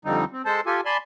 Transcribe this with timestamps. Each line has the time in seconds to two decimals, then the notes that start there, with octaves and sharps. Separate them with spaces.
0.05 F2 D3 F3 G3 C4 D#4
0.32 C4
0.45 G#3 A4 C5 A5
0.66 F4 G4 A4 G#5
0.86 D5 G#5 A5 B5 C6